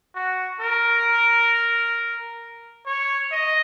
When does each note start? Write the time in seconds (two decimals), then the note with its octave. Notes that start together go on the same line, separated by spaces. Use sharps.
0.15 F#4
0.61 A#4
2.87 C#5
3.32 D#5